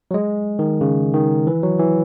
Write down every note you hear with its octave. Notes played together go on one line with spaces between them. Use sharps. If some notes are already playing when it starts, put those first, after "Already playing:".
F#3
G#3
D#3
C#3
D#3
E3
F#3
E3